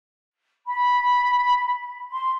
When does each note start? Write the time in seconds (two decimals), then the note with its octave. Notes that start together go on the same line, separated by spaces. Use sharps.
0.66 B5
2.10 C6